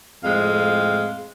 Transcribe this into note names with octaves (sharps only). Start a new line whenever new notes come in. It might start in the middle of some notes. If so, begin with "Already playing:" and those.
F2 A2 G#3 C4 F5